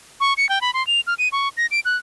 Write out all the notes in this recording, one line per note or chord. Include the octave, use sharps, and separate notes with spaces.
C#6
C#7
G5
B5
C6
F7
F6
D#7
C#6
A#6
D7
F#6